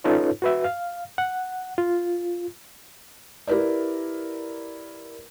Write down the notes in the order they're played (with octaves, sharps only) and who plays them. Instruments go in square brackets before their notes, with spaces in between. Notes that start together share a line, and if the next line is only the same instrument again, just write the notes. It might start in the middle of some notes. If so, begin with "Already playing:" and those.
[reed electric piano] C#4 D#4 F4 A4 B4 C#5
F#4 B4 E5
F5
F#5
F4
[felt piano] E4 G4 A#4 B4 D5